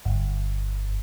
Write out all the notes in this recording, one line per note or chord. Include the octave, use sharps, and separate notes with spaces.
G1